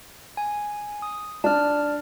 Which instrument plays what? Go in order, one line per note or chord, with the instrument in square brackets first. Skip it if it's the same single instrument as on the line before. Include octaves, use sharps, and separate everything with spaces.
[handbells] G#5
D#6
[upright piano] D4 [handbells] A5 F6